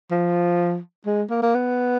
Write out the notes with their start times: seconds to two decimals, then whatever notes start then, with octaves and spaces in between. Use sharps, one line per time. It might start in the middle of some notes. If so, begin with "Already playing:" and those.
0.11 F3
1.06 G#3
1.30 A#3
1.42 A#3
1.55 B3